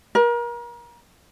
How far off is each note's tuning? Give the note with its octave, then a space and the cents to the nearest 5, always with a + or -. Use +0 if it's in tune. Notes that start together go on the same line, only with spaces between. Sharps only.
A#4 +35